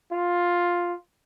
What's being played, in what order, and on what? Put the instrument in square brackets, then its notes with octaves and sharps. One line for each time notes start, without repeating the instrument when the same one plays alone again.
[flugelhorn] F4